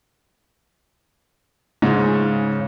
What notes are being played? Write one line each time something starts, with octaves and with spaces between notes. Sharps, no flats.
G#2 C#3